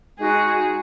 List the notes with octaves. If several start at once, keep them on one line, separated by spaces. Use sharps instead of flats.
G#3 D#4 F#4 G#4